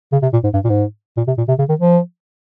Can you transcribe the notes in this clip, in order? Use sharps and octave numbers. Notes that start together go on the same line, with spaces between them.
C#3
C3
A#2
G#2
G2
A#2
G#2
A#2
C3
A#2
C3
C#3
D#3
F3